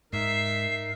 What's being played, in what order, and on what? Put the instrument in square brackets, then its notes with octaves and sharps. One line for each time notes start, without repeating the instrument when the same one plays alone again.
[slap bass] G#2 [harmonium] D#4 A#4 [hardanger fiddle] E5 [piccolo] C7